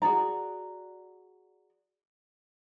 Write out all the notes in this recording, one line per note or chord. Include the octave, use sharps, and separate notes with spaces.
F#4 G#4 D5 A#5